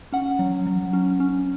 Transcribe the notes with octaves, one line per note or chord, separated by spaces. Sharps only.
C#4 F#5
F#3
F#3
C#4
C#4